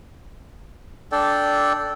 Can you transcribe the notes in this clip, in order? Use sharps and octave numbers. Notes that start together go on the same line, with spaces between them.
D4 A4 D5 G5